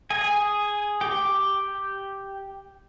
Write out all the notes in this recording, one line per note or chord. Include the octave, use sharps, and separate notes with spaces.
G#4 G#5
G4 G5